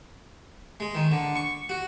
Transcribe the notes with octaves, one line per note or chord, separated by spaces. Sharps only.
G#3
D#3
D3
C#6
F#4